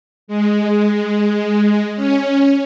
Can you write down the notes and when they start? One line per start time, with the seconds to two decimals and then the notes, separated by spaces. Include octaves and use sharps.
0.28 G#3
1.96 C#4